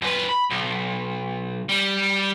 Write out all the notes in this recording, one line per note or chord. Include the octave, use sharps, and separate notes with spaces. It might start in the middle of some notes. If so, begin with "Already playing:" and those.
F#2 B4
B5
B1
G3